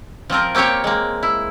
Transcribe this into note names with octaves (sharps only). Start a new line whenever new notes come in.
F3 C4 F4 A#4
A#3 C4 G4 C#5 G5
G#3 A#3
E4